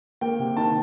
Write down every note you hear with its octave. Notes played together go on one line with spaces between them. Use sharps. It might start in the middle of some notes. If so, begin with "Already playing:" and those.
A#3 G5
C3
D#3 A5